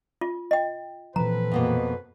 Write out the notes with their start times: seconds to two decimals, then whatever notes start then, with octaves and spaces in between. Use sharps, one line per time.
0.21 F4
0.51 D#5 G5
1.16 A#2 E3 F3 C4 A4 B4 A#5
1.51 F2 B2 A#3